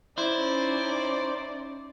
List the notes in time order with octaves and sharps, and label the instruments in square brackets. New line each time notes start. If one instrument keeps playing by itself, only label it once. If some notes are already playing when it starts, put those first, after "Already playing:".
[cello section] C#4 D#4 [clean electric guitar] E4 [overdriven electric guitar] C5 [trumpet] D5